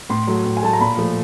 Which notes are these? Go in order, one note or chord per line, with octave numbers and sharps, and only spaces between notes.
A2 C6
F#3 A3
A2
G#5
F#3 A3 A5
A#5
A#2 B5
F3 A3